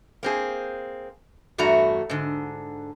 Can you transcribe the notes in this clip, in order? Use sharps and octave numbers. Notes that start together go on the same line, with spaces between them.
A#3 C4 G#4
E2 G2 A3 F#4 A#5
G#2 D3